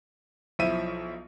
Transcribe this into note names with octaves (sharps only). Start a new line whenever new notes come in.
B1 F3 E4 E5 D#7